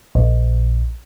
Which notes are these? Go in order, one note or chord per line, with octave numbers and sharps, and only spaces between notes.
A#1